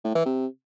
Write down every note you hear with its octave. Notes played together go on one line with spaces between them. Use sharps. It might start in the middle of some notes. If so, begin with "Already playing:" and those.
A2
E3
C3